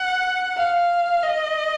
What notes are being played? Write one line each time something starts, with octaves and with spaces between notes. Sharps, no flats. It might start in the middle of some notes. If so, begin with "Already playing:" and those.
Already playing: F#5
F5
D#5